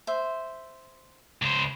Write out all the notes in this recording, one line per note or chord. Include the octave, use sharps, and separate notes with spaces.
C5 E5
C#2 C5